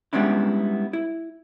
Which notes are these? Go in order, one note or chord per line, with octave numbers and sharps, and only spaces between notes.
G3 G#3 B3 C#4 D4 E4
E4